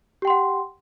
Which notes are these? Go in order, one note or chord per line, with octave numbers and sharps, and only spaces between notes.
G4 F#5 G5 C6